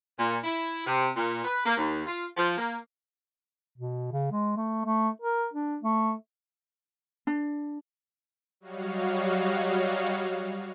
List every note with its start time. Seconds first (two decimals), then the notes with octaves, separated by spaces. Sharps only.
0.18 A#2
0.44 E4
0.86 C3
1.15 A#2
1.44 B4
1.64 A#3
1.78 D#2
2.06 F4
2.36 F3
2.57 A#3
3.78 B2
4.13 C#3
4.32 G#3
4.57 A3
4.85 A3
5.22 A#4
5.54 D4
5.83 A3
7.27 D4
8.60 F#3 G3 F#4 C#5 D#5 F5